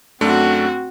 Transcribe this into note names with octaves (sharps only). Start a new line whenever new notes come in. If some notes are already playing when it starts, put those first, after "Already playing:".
F#2 A3 C4 D4 F#4